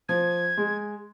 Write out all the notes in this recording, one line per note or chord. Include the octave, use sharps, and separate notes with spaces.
F3 G#6
G#3